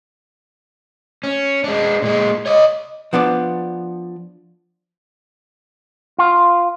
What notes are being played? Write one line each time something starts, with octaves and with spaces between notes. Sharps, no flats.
C#4
G#3 D4
A#2 G#3
C#5 D#5
F3 B3 D4 D5
F4